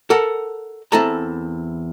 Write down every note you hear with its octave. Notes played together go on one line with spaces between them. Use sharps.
A4 A#4 F#5 A5
E2 C4 E4 A4 A5 A#5